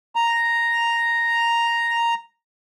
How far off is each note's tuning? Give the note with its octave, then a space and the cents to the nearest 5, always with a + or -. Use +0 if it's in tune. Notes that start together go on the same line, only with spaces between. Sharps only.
A#5 +0